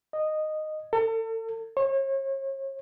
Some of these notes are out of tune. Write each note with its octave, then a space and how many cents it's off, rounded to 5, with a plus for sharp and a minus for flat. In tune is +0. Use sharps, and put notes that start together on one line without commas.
D#5 -10
A4 +35
C#5 -40